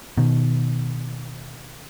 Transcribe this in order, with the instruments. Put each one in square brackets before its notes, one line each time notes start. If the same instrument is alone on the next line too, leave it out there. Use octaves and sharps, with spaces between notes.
[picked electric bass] B2 D#3